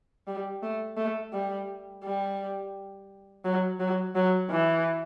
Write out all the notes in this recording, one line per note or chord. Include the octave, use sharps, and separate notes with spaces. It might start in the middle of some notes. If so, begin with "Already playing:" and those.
G3
A3
A3
G3
G3
F#3
F#3
F#3
E3